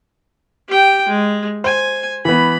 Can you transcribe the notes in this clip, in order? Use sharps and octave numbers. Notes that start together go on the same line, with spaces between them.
G4 G5
G#3
C5 G#5
E3 B3 B5